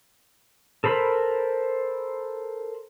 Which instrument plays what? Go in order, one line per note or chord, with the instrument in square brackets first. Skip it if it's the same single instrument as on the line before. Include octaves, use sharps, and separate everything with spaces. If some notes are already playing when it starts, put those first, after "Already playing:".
[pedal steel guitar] A4 A#4 C5 B5